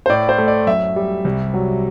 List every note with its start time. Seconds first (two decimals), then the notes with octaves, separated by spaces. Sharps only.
0.06 C5
0.09 A2 D5
0.29 C5
0.38 A3
0.48 D5
0.67 F#2 E5
0.96 G3
1.25 C2
1.54 F#3